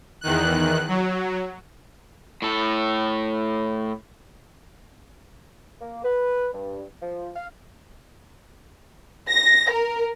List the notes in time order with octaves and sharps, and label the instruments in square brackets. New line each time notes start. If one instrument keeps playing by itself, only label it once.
[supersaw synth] E2 D#3 F#6
F#3
[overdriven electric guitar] A2 A4
[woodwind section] A#3
B4
G2
F3
F5
[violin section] A#6
A#4